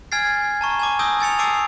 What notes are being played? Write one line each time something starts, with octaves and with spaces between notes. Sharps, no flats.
G#5 F6 G#6 A6 C7
A5 A#5 C#6
G#5 A5 D6
G#5 D#6 E6 G6 A#6 G7
G#5 A6 C#7 F7
A5 D6 E6 C7 D7